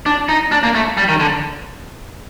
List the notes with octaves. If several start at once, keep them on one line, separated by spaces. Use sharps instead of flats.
D4
D#4
D4
A#3
A3
G3
D#3
D3